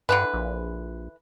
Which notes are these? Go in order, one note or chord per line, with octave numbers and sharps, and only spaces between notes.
G2 D3 E3 B4
A#1